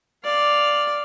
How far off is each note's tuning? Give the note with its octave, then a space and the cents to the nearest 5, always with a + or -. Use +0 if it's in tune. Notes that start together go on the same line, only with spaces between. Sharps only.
D5 +0 F5 +0